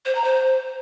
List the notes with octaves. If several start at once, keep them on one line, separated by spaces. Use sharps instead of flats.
C5
A#5
C5